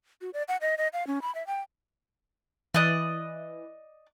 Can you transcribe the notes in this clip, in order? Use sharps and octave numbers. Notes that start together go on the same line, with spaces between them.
F#4
D5
F#5
D#5
D#5
F5
C#4
B5
E5
G5
E3 D5 D#5 F#6